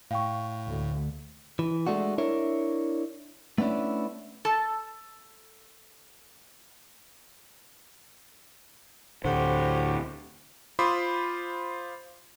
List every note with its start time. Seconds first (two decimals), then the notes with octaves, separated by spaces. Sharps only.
0.11 A2 F5 G5 C#6
0.67 D2
1.59 E3
1.87 G#3 A3 D4 F#4
2.18 D4 E4 A#4 C#5
3.58 A3 B3 C#4 D4 E4
4.45 A4 A5
9.25 D2 A2 F#4 G4 C5
10.79 F4 C5 B5 C6 D6 D#6